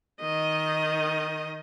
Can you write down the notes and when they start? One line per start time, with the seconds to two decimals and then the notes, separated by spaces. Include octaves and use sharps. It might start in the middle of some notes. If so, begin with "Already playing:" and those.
0.21 D#3 D#5